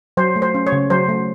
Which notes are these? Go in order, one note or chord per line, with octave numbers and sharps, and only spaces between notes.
F#3 C5
A3
C5
C#4
C#5
C#3
F#3 C5
A3